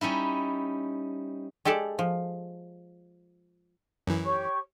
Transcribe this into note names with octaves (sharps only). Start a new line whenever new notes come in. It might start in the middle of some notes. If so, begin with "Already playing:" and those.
G3 C#4 D#4 E4
G#3 G4 A4 D5 A5
F3
F#2 E3
G4 C#5 C#6